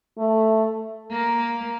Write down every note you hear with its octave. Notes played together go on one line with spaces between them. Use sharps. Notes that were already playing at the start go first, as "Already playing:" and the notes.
A3
A#3